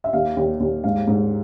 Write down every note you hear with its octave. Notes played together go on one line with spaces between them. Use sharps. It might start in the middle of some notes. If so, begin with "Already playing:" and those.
E5
D#2 F5
D#2
D#2
G#2 F5
G#2